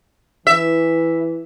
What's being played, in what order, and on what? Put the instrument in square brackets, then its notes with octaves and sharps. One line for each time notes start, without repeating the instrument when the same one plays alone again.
[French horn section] E3 [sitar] E5